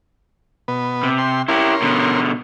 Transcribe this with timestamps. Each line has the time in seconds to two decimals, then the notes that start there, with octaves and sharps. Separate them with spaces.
0.68 B2 B3
1.03 C3
1.18 G5 C6
1.48 C#4 E4 G4 A#4 C6
1.82 B2 D3